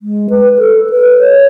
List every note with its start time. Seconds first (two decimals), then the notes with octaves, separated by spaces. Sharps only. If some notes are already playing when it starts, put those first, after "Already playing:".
0.01 G#3
0.30 B4
0.59 A4
0.90 B4
1.19 C#5